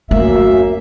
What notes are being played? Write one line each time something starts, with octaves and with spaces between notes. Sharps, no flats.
F#2 A3 A#3 E5